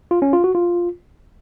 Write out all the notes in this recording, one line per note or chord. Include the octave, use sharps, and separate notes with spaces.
F4
C#4
F4
F#4
F4